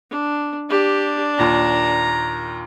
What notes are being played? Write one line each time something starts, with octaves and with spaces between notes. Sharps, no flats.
D4
D4 G4
D#2 A#2 A#5